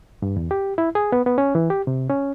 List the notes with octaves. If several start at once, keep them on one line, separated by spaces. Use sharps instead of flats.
G2
E2
G4
E4
G#4
B3
B3
C#4
E3
G4
C3
C#4